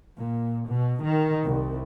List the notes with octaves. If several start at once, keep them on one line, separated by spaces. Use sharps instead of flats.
A#2
B2
D#3
C2